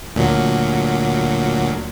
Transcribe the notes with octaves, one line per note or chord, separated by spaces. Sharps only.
D2 A#2 F#3